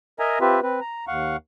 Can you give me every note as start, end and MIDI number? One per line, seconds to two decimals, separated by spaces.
0.19 0.39 70
0.19 0.39 75
0.19 0.39 76
0.19 0.39 80
0.19 0.39 82
0.41 0.60 60
0.41 0.60 65
0.41 0.60 67
0.41 0.60 71
0.41 0.60 76
0.63 0.80 60
0.63 0.80 71
0.81 1.05 82
1.08 1.37 39
1.08 1.37 77
1.08 1.37 78
1.08 1.37 85